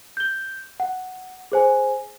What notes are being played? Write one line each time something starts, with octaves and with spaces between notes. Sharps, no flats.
G6 G7
F#5
G#4 C5 G#5